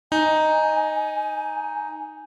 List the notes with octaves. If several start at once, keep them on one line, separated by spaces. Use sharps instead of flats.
D#4 G#5